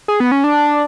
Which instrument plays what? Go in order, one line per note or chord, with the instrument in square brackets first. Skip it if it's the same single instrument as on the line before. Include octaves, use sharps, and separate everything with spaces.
[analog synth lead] G#4
B3
C#4
D4